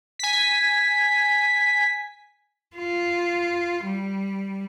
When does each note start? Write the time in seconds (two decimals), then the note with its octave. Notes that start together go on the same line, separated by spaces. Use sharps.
0.19 G#5 B6
2.76 F4
3.84 G3